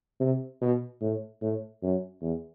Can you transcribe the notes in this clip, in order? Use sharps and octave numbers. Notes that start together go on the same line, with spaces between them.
C3
B2
A2
A2
F#2
E2